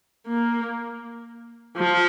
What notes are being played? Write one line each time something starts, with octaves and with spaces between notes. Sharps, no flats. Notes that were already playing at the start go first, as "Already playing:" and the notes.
A#3
F3